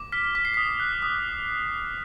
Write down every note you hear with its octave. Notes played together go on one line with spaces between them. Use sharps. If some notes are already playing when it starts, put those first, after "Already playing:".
Already playing: D6
F6 B6
D6 B6
C7
D#6 B6
F#6
D#6